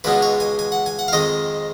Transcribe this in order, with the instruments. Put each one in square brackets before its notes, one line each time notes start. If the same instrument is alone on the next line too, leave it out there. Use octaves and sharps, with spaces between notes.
[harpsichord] C#2 B2 G#3 B3 B4
C#5
G#5
G#5
F#5
G#5
F#5
F5
F2 D#3 G#3 D#5